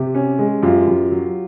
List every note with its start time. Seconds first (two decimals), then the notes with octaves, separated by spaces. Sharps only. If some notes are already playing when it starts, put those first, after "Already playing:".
Already playing: C3 G4
0.15 C#4
0.39 G#3
0.63 F#2 F4 G4
0.87 F#2
1.12 F#3